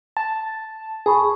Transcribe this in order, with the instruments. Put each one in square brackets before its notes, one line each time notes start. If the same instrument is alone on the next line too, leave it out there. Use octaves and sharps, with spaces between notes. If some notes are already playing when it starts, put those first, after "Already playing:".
[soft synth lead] A5
[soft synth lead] G#4 [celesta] A5 B5 C#6